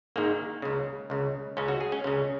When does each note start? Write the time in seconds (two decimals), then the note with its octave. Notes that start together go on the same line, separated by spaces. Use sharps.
0.16 G#1 G#2 D#3 A#3
0.62 C#2 C#3
1.10 C#2 C#3
1.57 C#2 C#3 C#4
1.68 F#4
1.81 G#4
1.92 C#4
2.04 C#2 C#3 C#4